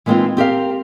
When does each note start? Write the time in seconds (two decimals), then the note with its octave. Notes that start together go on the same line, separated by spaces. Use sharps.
0.06 E3 G#3 A#3 C4 D#4 F4
0.37 C4 G4 A#4 F5